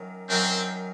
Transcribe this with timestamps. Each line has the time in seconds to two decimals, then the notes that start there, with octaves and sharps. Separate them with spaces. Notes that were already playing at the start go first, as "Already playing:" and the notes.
Already playing: F#2 D#3 F#3
0.29 F#2 D#3 F#3 C4